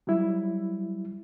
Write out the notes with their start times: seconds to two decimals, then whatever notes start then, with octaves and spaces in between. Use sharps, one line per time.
0.07 F#3 G3 E4